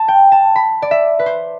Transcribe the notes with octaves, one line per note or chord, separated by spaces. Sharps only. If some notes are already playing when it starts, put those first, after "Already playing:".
Already playing: A5
G5
A5
B5
D5
E5
B4
C5